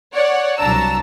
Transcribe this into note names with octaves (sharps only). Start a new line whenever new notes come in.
C#5 D5 F#5
C2 F#3 D4 A5 A#5 E6